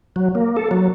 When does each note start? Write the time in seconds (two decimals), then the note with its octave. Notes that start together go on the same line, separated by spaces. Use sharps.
0.16 F#3
0.35 A#3
0.57 A4
0.71 F#3